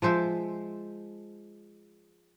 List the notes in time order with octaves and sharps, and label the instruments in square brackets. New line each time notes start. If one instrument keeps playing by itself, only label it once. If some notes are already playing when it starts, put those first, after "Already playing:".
[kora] F3 G#3 C5 E5